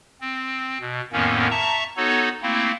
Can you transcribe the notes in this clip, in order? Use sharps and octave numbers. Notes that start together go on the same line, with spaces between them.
C4
B2
F2 A2 D#3 A#3 B3 C#4
E5 A5 A#5 C#6
B3 D#4 F#4 A4 C#5
A3 A#3 C4 E4